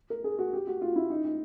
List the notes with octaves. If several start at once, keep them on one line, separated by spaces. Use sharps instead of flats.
A#4
G#4
F#4
G4
F#4
F4
E4
D#4
D#4